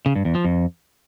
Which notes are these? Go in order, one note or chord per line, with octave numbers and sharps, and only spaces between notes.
C#3
G2
E2
F3
F2